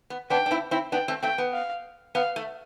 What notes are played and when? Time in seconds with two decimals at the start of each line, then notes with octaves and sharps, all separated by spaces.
0.10 B3
0.30 B3 D4 G5
0.46 D4
0.51 C4 E4
0.71 C4 E4
0.92 B3 D4 G5
1.08 A3 C4
1.23 A3 C4 G5
1.38 B3
1.53 F5
2.15 B3 F5
2.36 A3